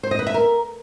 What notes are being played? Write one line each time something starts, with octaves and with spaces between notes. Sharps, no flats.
C5
D#5
B4
E5
A#4